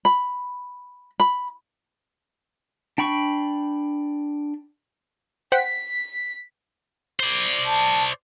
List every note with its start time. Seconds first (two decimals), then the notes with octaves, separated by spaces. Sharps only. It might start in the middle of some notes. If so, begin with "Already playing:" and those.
0.05 B5
1.20 B5
2.98 D4 G5 B5 C#6
5.52 C5 F#5 G5 B6
7.20 C5 D5
7.65 A5